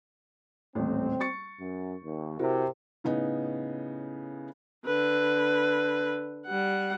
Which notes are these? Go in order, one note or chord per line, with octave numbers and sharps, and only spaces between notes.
D#1 A1 C4
C#6 A6 C#7
F#2
D#2
C3 E4 F#4 A#4
A2 C#3 B3 D#4
D3 B4
G3 F#5